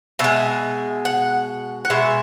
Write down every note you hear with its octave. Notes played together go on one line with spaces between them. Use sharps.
B2 G#3 E5
F#5
F#5
B2 G#3 E5